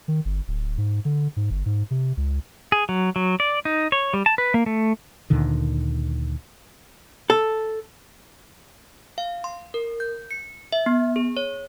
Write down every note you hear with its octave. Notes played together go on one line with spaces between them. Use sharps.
D#3
G1
D1
G#2
D3
G#2
G1
G#2
C3
C#2
G#4
F#3
F#3
D5
D#4
C#5
G3
A5
B4
A#3
A3
D2 A#2 D3 D#3
A4
F5
C6
A#4
G6
C#7
E5
B3
G#4
C#5